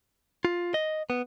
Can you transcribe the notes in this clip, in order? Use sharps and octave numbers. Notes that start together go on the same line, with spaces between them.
F4
D#5
B3